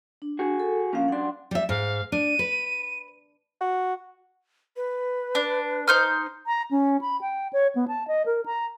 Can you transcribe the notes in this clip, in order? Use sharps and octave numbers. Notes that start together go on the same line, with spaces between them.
D4
F#4 G#4
A4
A#2 F3 A#3 C#4 F5
F#2 D4 F#5 C6
G3 E5
G#2 F5
D4 D#7
B4
F#4
B4
D4
D#4 C5 F6
A#5
C#4
B5
G5
C#5
B3
A5
D#5
A#4
A#5